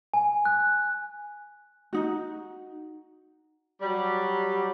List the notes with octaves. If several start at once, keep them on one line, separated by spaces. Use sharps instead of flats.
G#5
F#6
D#4 F#4
F#3 G3